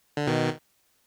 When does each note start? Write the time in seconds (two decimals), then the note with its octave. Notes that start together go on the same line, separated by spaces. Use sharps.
0.17 D3
0.27 B2 D#3